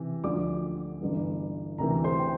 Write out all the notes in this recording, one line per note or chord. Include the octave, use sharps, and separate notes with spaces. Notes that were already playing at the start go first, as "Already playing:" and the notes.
Already playing: C3 E3
D2 D3 F3 D5 D6
G1 G2 E3
D2 C3 E3 A#4 A#5
C5 C6
G5